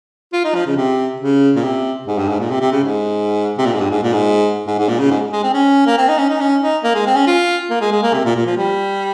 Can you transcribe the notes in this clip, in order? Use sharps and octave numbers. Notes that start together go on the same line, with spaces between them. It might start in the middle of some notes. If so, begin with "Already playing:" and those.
F4
D#4
F3
C#3
C3
C#3
A#2
C3
G#2
G2
G#2
A#2
C3
C3
C#3
G#2
C3
A#2
G#2
G2
G#2
A#2
G#2
G#2
G#2
A#2
C#3
G#2
G#3
C4
C#4
A#3
C4
D#4
C#4
D#4
C#4
D#4
A#3
G#3
C4
C#4
F4
A#3
G#3
G#3
A#3
C3
A#2
A#2
F3
G3